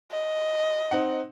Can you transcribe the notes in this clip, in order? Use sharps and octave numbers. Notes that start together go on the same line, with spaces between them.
D#5
C4 D#4 F#5